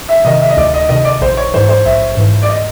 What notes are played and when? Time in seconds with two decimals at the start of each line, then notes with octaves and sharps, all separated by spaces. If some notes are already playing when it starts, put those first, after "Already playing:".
0.09 E5
0.25 C3 D#3 D#5
0.41 E5
0.50 D#5
0.57 D2 D5
0.74 D#5
0.89 C3 D#3 D#5
1.05 D5
1.21 A#1 C5
1.37 C#5
1.54 G#2 E3 C5
1.69 C5
1.85 A#1 E5
2.17 G#2 E3
2.43 D5
2.49 D#5